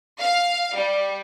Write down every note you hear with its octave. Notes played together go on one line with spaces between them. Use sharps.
F5
G3